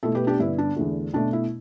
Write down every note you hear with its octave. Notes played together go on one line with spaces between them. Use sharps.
B2 A3 E4 A4
G4 B4
D4 G4
G2 D3 B3 E4
D4
E2 D3 A3
B2 A3 D4
E4